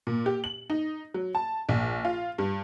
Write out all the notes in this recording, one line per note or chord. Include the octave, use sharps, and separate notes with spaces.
A#2
G4
F#7
D#4
F#3
A5
A#1
F4
G2